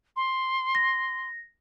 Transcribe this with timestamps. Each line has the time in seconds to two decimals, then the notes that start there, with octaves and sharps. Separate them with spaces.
0.16 C6
0.75 A#6